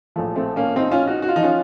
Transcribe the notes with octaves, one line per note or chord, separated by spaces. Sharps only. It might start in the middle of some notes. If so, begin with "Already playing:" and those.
A#1 A2 F3 A3
A3 C4
A#3 C#4
C4 D#4
C#4 F4
D#4 F#4
F#4
F4
F3 D#4
C#4 F4